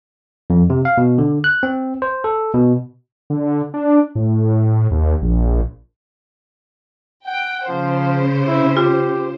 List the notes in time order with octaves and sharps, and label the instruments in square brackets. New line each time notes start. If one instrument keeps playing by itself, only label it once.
[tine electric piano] F2
C3
F5
B2
D3
F#6
C4
C5
A4
B2
[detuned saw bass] D3
D4
A2
D#2
A#1
[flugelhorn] F#5 [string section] G5
[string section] C#3 C5 [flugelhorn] F3
[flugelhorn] E4
[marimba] F4 [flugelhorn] G4